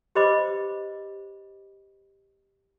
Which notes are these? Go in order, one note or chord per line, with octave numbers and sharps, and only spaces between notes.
G4 B4 C5 D#5 B5 D6